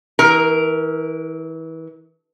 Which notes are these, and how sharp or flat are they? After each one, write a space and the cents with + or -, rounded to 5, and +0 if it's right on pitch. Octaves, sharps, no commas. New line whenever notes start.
E3 -30 A#4 +0